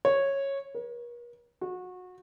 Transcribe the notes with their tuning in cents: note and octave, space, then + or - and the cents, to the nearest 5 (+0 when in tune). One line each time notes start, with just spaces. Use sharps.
C#5 -10
A#4 +45
F#4 -25